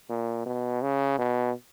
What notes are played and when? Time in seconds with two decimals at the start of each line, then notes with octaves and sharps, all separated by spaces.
0.09 A#2
0.46 B2
0.82 C#3
1.19 B2